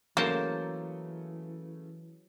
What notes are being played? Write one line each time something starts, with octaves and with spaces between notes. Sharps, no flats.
C#3 E3 F#3 A3 A#3 C5 A5